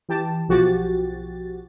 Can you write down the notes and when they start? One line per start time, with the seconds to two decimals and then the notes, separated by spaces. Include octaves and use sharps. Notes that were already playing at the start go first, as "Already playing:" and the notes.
0.09 E3 G4 A5
0.48 B1 F3 F#4 G4 A6